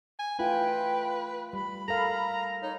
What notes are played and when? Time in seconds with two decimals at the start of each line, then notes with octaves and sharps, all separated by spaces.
0.19 G#5
0.39 A3 E4 F4 B4 G5
1.53 G3 B5
1.88 A4 A#4 F5 A#5
2.62 D#4 C#5